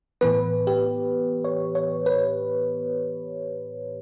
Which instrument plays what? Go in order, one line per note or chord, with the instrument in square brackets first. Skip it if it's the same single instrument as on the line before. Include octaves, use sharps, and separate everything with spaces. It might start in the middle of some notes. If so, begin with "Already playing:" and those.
[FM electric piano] A2 E3 B3 B4
G4
C#5
C#5
B4